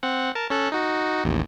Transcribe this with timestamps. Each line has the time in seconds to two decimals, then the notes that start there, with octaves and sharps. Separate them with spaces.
0.03 C4 F#5
0.35 A#4 A5
0.50 C#4 A4 F#6
0.72 D#4 F#4
1.24 A1 D#2